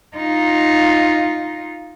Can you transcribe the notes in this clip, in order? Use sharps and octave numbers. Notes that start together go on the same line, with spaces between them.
D#4 F4